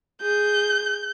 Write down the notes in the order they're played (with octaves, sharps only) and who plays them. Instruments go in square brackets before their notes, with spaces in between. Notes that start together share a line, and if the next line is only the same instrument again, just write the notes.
[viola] G#4 [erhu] G6